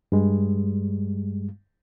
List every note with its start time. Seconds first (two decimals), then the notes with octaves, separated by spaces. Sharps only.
0.12 G2 G3 G#3